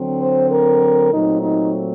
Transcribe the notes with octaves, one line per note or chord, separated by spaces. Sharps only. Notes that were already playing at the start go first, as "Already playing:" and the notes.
Already playing: D3 F#3 C4
C5
A#4
A#2 F#3 A3 C4 D#4
D#4